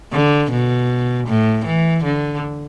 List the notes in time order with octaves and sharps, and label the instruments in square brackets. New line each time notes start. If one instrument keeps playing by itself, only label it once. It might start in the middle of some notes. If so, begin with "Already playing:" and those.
[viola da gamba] D3
B2
A2
E3
D3